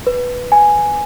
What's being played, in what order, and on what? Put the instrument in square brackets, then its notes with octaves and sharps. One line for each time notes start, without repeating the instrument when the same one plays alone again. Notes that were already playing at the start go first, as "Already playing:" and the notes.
[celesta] B4
G#5